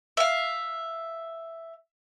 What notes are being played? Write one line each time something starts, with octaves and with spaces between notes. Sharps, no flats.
E5 F5